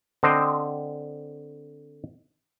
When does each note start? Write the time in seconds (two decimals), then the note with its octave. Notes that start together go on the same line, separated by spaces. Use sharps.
0.23 D3 C4 C5 D#5 G5